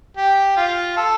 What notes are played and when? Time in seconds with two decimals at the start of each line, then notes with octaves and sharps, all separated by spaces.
0.17 G4
0.57 F4
0.96 A4